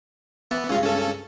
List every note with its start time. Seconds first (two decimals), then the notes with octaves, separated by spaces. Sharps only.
0.51 E3 B3 A5
0.69 C#2 G2 C#4 F4
0.82 C#4 A4